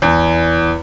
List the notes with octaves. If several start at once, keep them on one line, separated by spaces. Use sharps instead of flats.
E2